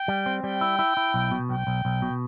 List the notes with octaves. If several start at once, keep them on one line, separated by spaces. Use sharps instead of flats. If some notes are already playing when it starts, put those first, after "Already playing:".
Already playing: G5
G3
C4
G3 G5
E4
E4
E4
B1
B2
B1 G5
B1
B1
B2